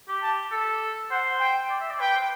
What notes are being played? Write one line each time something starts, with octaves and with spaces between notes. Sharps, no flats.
G4
A5
A4
C5 F#5
G5
D5
E5
D5
B4 G5
C5